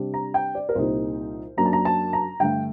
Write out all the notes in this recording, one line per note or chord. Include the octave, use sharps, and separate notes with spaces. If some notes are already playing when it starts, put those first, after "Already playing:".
Already playing: C3 G3 D4
A#5
G5
D5
A#4
C2 A#2 G3 A#3 D#4 C5
F#2 F#3 A#3 D4 A#5
A5
A#5
A5
A#5
G2 D3 A3 G5